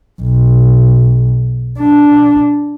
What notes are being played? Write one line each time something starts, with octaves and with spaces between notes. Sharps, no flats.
B1
D4